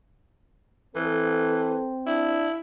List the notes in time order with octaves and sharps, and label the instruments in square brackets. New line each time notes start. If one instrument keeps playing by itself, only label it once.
[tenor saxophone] E3 [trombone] C4 [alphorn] A4
[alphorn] D4 [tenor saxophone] E4